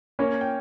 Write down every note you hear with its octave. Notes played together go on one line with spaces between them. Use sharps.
A#3 C#4 C#5
G5